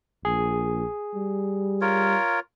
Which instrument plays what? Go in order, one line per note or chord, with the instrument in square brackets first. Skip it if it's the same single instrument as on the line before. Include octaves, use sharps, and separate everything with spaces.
[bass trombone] A#1 [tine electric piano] G#4
[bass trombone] G3
[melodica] F4 A#4 C#5